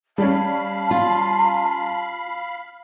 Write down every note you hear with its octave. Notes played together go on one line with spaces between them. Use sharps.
G3 C#4 F5 A5 B5
F4